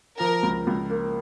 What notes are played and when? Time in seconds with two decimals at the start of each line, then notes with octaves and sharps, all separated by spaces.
0.19 F3 A#4
0.43 C#2
0.67 C#2
0.90 A#3